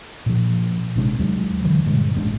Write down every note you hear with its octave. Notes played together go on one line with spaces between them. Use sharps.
A#2 F3
G#1 C3 G#3 D4
D#2 D#3 F#3 G#3
B2 D3 E3 F#3
G2 A#2 D3 G#3
D#1 A1 G#3 D4